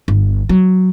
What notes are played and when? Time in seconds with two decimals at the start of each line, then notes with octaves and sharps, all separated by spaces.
0.08 G1
0.49 F#3